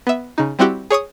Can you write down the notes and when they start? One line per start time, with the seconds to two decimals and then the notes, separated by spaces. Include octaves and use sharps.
0.07 B3 E5
0.38 C#3 D#4
0.59 G3 C4 E4 F#4 G4
0.91 G#4 C#5 C#6 D#6